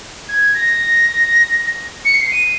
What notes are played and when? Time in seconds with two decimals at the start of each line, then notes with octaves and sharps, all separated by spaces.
0.29 G#6
0.55 A#6
2.05 C#7
2.14 C7
2.32 D#7